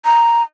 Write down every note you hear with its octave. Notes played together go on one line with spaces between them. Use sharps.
A#5